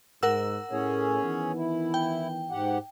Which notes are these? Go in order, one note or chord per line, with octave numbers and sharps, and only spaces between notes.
G#2 A#4 F#5 E6
A2 C#4 G#4 C#5
D#3 E3 B3
E4
G5
G#2 G4 F#5